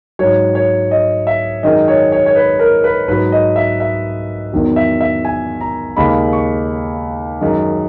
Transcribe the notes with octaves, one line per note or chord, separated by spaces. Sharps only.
G#2 F#3 C#5
C#5
D#5
E5
F#2 D#3 G#3 D#5
C#5
C#5
C#5
B4
A#4
B4
G#2 F#3 B4
D#5
E5
E5
E2 D#3 F#3
E5
E5
G#5
A#5
D#2 C#3 G#3 B5
C#6
F#2 D#3 G#3